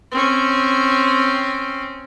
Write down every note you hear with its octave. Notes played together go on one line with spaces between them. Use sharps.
C4 C#4